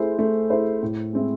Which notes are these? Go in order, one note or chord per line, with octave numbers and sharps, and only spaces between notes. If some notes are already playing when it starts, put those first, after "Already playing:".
Already playing: A3 E4 G#4 C5
A3
E4 G#4 C5
A2
G#3 C4 E4